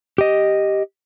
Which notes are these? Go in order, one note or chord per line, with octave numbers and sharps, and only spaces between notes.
G4 D#5